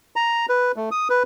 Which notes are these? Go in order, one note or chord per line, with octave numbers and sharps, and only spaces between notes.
A#5
B4
A3
D#6
B4